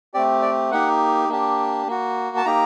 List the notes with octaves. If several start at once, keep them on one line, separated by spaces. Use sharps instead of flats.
A3 C4 G4 D5
D5
A#3 D#4 G4 F#5
A#3 D4 G4
A#3 F#4
A5
A#3 D#4 G4 A#5